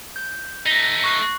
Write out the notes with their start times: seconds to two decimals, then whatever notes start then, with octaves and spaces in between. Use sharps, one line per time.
0.16 G6
0.66 A3 D#4 A#6 B6
1.04 C#6 F#6 C7